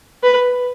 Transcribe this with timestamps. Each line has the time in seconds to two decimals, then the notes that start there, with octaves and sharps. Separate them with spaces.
0.23 B4